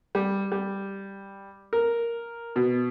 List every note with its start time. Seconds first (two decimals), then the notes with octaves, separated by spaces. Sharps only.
0.15 G3
0.52 G3
1.73 A#4
2.56 B2